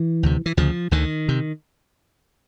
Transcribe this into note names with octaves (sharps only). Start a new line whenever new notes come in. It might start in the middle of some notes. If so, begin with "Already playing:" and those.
Already playing: E3
D2 C3
E3
D2 C#3 F3
D2 D3 D#3
C3